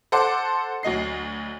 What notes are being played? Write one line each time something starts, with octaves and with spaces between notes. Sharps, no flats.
A4 C5 F#5 D6
D2 F#3 D#5 C7